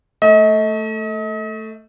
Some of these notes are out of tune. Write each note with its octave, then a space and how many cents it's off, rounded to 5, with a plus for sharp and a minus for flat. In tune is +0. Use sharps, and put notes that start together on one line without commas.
A3 +5 D#5 +40